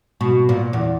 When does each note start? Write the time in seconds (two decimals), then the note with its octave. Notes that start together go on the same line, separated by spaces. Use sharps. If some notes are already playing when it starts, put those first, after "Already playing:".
0.21 B2
0.49 A#2
0.73 E2